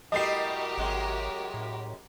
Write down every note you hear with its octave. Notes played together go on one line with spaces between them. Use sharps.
G3 A3 E4 F#4 G4 A#4 D#5 C7
G#1 F#2 G#3
A2